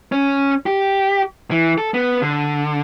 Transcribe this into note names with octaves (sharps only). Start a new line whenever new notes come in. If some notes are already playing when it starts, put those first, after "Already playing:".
C#4
G4
E3
A4
B3
D3